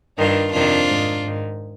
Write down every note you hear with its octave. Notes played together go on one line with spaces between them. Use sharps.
G2 D#3 D4 F4
F2 C3 D#3 D4 F4
G#2 D#3
G#2 D#3